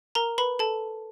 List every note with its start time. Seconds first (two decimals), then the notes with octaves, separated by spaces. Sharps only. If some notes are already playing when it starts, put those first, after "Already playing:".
0.15 A#4 A#5
0.38 B4 B5
0.59 A4 A5